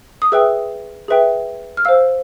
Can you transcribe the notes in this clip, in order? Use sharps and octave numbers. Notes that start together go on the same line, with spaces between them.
D#6
G#4 B4 E5 G5 E6
G#4 B4 E5 G5
F6
C5 F5 E6